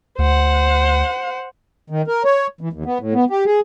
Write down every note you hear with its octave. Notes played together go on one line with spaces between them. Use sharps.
D2 C5 F#5
D#3
A#4
C#5
E3
D#2
B3
A2
B3
G4
G#4